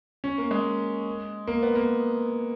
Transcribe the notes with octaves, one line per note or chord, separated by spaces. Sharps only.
C#4
A#3
G#3
A#3
B3
A#3